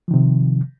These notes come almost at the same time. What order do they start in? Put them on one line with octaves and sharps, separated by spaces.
F3 D#3 C3